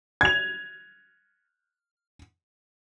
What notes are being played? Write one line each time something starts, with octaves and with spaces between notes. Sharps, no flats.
G#6 F7